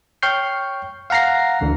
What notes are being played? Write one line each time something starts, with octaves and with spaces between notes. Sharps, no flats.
C#5 G5 C#6 F6 G6 C7
F5 F#5 A#5 A#6 C7
D2 D3 E3